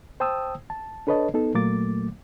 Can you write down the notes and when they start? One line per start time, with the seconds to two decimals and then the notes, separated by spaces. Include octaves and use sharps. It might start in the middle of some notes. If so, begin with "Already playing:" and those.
0.20 C5 G5 A5 D#6 E6
0.70 A5
1.07 D4 A4 B4 C#5 D#5 A5
1.34 B3 D#4 A4
1.54 A#2 F#3 A3 A#3 D6 A6